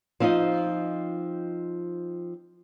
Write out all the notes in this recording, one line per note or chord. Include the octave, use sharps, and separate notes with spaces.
F3 C4 D#4 F4 D#5